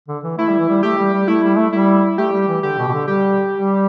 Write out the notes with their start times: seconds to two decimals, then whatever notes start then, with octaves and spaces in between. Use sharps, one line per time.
0.08 D3
0.24 E3
0.38 A3 E4
0.49 G3
0.59 E3
0.69 G3
0.83 A3 G4
0.98 G3
1.13 G3
1.28 A3 E4
1.44 G3
1.58 A3
1.73 G3 E4
2.18 A3 G4
2.33 G3
2.48 E3
2.63 D3 G4
2.78 B2
2.88 B2
2.94 D3
3.07 G3 G4
3.53 G3